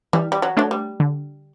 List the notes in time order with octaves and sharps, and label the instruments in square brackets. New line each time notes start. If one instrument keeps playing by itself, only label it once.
[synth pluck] E3 [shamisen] G3
[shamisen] G3
F#3
[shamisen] F#3 [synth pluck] A3 D4
[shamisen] G3
[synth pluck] D3